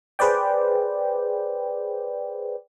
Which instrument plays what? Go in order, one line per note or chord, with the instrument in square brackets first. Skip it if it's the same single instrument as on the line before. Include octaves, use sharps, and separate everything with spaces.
[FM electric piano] G#4 B4 C5 D5 G5